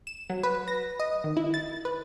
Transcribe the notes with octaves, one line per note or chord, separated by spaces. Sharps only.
E7
F#3
B4
A#6
D#5
D#3
E4
A6
B4